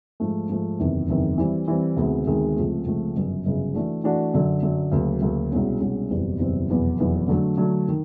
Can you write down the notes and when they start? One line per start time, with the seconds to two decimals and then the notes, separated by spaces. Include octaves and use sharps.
0.20 G#2 F3 A3
0.49 G#2 F3 A3
0.79 F#1 E2 C3 D#3
1.08 F#1 E2 C3 D#3
1.38 E3 G3 C4
1.68 E3 G3 C4
1.96 D2 C3 D#3 G#3 B3
2.26 D2 C3 D#3 G#3 B3
2.56 C#2 C3 F3 A3
2.86 C#2 C3 F3 A3
3.15 G1 F#2 C#3
3.45 G1 F#2 C#3
3.74 E3 A3 D4 F#4
4.04 E3 A3 D4 F#4
4.34 F#2 D3 F#3
4.63 F#2 D3 F#3
4.92 D2 C#3 F#3 A#3
5.22 D2 C#3 F#3 A#3
5.51 C2 B2 G#3 C#4 F#4
5.80 C2 B2 G#3 C#4 F#4
6.10 F#1 E2 B2 G3 C4
6.39 F#1 E2 B2 G3 C4
6.69 F1 E2 B2 F#3 B3
6.99 F1 E2 B2 F#3 B3
7.28 D3 F#3 A3 D4
7.57 D3 F#3 A3 D4
7.88 D#3